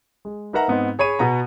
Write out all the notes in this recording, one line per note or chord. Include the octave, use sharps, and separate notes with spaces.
G#3
D#4 A#4 B4 E5 F#5 A#5
G#2 B3 C4 D#4
G#4 C#5 B5 D#7
B2 B3 A#5